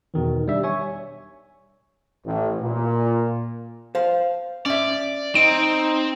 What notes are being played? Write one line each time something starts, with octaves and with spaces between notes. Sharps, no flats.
E2 B2 D#3 E3
G3 D4 E5
C#5 E5 G#5 C#6
A1
A#2
C5 F5
C#4 D5 E5
C4 D#4 D7